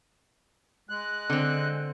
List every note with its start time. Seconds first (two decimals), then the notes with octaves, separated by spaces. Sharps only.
0.89 G#3 F#6
1.30 D3 C4